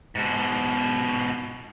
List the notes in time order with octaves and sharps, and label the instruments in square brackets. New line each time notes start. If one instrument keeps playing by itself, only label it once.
[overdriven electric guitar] G#2 B2